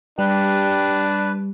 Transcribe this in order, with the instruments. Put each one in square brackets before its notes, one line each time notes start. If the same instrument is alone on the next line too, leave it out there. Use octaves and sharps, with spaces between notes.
[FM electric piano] G3 [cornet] D4 [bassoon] G4 [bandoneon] B4